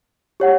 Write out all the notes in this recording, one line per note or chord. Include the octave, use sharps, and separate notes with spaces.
G4 C#5 F#5